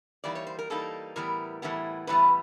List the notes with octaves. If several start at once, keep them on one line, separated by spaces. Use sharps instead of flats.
E3 G3 A#3 D#4 D5
C#5
C5
A#4
E3 G3 A#3 D#4 A4
A2 E3 G3 B3 A#4
A2 E3 G3 B3
A2 E3 G3 B3 B4